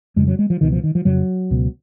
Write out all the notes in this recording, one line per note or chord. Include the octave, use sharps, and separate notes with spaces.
F2 C#3 G#3
F#3
G#3
F3
C#2 B2 D#3
F3
D#3
F3
F2 C#3 F#3
C#2 B2